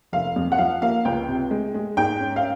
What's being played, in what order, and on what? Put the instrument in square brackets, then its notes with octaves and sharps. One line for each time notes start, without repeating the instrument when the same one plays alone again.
[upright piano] F1 F5
F2
F#5
F3 F5
A#3 F5
C#2 G5
C3
G#3
G#3
G#2 G5
C#4
F5